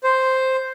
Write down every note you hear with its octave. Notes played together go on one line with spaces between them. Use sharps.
C5